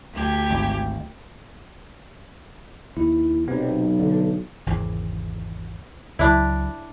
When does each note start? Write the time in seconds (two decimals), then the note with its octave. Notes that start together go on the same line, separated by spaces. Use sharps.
0.13 D2 G4 G#6
0.51 G#1
2.97 D#2 E4
3.48 B1 C3 B3
3.99 D3
4.66 G#1 E2 C#3
6.19 C#2 F#3 D4 E4